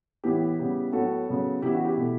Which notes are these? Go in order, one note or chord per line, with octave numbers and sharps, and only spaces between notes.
A2 E3 B3 E4 G4
C#3 G3 B3
A2 F#3 B3 F#4 A4
C#3 F#3 B3
C#3 E3 B3 E4 G4
F#4
E4 G4
B2 A3